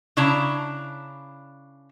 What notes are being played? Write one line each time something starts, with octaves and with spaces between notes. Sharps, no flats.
C#3 D4 E4 A5 A#5